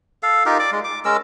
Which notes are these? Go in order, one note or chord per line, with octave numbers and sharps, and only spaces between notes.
A4 F5
D#4 F4 G4 A#4
D5 D6
G#3
D6
G#3 C#4 A#4 E6